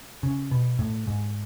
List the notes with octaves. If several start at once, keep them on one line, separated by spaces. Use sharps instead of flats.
C#3
B2
A2
G#2